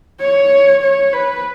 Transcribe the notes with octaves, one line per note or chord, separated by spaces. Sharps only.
C#5
C#5
B4